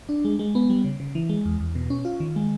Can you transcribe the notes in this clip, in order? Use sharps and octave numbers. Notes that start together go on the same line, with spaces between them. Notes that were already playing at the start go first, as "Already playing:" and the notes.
D4
G#3
G#3
B3
G3
C#3
C#3
E3
G#3
E2
E2
B2
C#4
F4
D#3
G#3